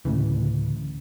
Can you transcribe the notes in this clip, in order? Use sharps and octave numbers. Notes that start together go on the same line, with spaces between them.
D2 A2 C#3 E3